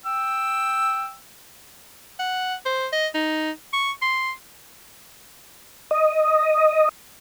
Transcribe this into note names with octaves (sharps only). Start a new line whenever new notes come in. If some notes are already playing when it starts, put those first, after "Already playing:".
G5 E6
F#5
C5
D#5
D#4
C#6
C6
D#5